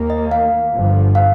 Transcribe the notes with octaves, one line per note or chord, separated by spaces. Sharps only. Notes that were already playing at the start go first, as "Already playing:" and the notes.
Already playing: D#2 D#3 A#3
D#5
F5
G1 G2 D3 F3
F5